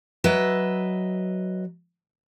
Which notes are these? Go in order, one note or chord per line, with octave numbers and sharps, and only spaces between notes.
F#3 B4 D#5 E5